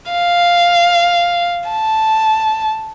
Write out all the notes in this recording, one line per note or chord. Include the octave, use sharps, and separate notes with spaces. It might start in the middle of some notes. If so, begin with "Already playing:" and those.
F5
A5